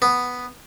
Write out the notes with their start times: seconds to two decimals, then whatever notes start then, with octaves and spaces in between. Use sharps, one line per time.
0.02 B3